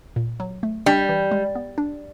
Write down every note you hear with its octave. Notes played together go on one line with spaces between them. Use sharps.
A#2
F#3
A3
G3 D4
E3
G#3
B3
D4